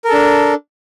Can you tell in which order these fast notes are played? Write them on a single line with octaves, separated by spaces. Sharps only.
A#4 A4 D4